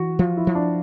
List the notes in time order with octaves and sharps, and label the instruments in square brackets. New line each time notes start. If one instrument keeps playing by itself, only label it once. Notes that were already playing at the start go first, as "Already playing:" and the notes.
Already playing: [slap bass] E3 [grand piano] F#4
[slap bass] F3 [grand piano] F4
[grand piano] E4
[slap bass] F3
[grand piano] D4